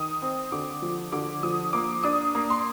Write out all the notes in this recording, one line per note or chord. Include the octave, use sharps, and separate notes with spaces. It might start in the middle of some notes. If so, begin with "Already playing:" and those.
Already playing: D#3 D#6
C4
D3 D6
F3
D3 D6
F3 D#6
A#3 D6
D4 D#6
A#3
C6